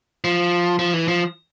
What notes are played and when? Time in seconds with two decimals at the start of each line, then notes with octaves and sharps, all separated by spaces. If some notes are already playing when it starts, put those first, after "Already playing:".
0.24 F3
0.79 F3
0.94 E3
1.08 F3